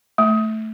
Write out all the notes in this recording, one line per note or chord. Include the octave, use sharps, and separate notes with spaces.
A3